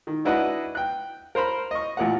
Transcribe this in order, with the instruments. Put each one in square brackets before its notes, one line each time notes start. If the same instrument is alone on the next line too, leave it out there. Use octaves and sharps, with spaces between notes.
[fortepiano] D#3
D4 E4 F#4 B4 D#5 F#5
G5 F#6
A#4 C5 A#5 B5
D#5 C#6
A1 A#2 A#4 F5 F#5